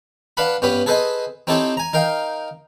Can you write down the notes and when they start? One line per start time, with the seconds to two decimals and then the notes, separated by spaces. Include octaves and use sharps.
0.37 D4 B4 F5 F#5 B5
0.62 G2 B3 C#4 G4 B5
0.86 G#4 A4 B4 C5 D#5 G#5
1.47 C4 D#4 E4 G4 A4 C#5
1.77 G#5 A#5
1.93 D#4 A#4 F5 G5